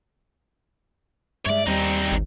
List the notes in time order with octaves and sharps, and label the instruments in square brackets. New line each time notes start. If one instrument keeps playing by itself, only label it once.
[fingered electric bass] G2 G#3 [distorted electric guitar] C#5 D5 [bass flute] E5
[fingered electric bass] D#2 [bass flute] G3 [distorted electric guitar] C4 D#4
[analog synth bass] G#1